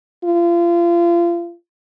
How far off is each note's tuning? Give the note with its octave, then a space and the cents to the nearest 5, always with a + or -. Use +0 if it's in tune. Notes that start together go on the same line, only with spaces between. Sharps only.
F4 -30